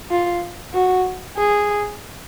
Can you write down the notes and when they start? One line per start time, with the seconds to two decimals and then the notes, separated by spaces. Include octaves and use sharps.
0.11 F4
0.74 F#4
1.37 G#4